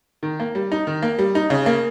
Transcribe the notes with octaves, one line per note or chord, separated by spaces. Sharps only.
D#3
A#3
G3
D#4
D#3
A#3
G3
D#4
C#3
A#3